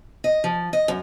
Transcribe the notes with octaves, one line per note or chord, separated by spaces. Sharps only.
D#5
F3
D#5
F#2